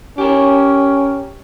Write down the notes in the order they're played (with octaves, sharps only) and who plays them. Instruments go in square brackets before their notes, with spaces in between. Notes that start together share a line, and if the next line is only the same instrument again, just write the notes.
[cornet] C#4 [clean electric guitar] G4 A#4